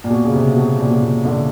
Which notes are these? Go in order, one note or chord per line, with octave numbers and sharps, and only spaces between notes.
A#2
B2
C#3
C3
B2
A#2
B2
A#2
D3